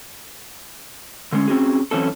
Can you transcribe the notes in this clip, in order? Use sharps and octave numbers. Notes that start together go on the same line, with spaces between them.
D3 G#3 C#4
C4 C#4 F#4 G#4
F#2 E3 C4 C#4 A4